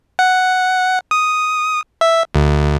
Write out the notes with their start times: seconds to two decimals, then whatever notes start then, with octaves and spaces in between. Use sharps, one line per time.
0.19 F#5
1.11 D#6
2.01 E5
2.35 D2